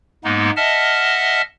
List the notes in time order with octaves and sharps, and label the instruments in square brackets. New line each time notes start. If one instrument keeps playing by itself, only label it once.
[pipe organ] G#2 G#3 A#3 B3 D#4
D#5 E5 F#5 A5 F6